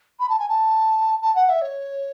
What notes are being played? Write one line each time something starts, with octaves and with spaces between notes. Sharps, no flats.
B5
A5
G#5
A5
A5
F#5
E5
C#5